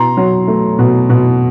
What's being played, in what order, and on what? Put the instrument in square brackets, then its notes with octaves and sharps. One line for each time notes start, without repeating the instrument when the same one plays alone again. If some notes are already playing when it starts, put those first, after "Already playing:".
Already playing: [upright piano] B2 A#5 C6
F#3
A3
B2
B2